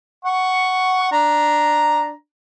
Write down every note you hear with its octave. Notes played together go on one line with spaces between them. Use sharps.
F#5 C#6
D4 A#5